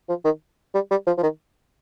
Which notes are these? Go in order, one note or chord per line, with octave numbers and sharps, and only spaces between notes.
F3
D#3
G3
G3
F3
F3
D#3